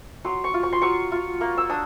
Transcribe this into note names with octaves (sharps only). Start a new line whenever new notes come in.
F#3 C6
C#6
F4
C#6
C6
F#3 C#6
F4
A#3
E6
D4 D#6